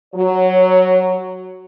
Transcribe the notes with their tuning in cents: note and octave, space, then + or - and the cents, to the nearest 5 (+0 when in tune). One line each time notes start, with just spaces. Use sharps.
F#3 +5 C#5 -15